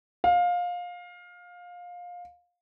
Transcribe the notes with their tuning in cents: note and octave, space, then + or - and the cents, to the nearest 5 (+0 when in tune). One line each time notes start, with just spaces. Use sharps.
F5 +20